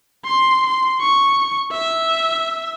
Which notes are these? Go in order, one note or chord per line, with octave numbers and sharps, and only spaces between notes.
C6
C6
C#6
E5